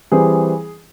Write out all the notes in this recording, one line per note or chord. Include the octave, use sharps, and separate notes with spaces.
E3 G3 C4 G#4